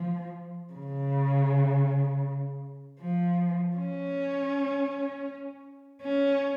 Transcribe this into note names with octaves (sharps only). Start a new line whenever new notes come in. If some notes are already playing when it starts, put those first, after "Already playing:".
Already playing: F3
C#3
F3
C#4
C#4